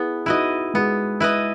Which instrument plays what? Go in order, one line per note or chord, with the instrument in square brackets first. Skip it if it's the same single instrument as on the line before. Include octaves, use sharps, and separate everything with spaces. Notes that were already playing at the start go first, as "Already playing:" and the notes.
Already playing: [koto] B3 [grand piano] E4 G#4
[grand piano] D#4 F#4 [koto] E4 B4 D#5
[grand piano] G#3 [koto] B3
[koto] E4 B4 D#5